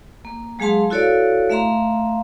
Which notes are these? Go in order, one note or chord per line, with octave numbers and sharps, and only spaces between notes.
A#3
F#3 G#3 G#4 F5 A5 C6
E4 F#4 A4 C#5 D5 F5
A3 E5 F5 A#5 C6